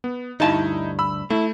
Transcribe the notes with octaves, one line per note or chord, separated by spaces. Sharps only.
B3
D2 G2 D#4 E4 A5
B5 E6
A3 E4